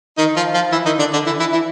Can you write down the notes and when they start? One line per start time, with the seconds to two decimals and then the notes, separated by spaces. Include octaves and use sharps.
0.18 D#3 D#4
0.36 F3 F4
0.54 F3 F4
0.72 E3 E4
0.85 D#3 D#4
0.99 D3 D4
1.13 D3 D4
1.26 E3 E4
1.40 E3 E4
1.52 E3 E4